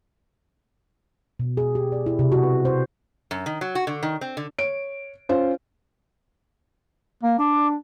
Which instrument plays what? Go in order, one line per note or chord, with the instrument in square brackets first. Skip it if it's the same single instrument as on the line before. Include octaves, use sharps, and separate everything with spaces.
[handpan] B2
G#4
G4
D5
E4
C3
F#4
B4
C5
[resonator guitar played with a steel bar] F#2
D#3
F#3
F#4
D3
D#3
C4
D3
[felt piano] C#5 D7
C#4 F4 C5
[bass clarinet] A#3
[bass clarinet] D4 [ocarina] D6